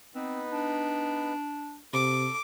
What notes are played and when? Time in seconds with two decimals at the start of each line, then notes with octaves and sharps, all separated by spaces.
0.15 B3 C4 D#4 B4
0.52 D4
1.93 C3 A4 D6